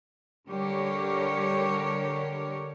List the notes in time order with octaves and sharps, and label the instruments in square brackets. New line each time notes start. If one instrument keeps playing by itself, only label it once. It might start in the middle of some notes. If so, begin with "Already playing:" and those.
[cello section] D3 G3 G4 A#4 C#5